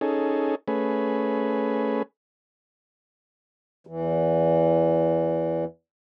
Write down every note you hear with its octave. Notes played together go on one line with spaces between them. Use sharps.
C#4 D#4 G#4 A4
A3 C#4 G#4 B4
E2 E3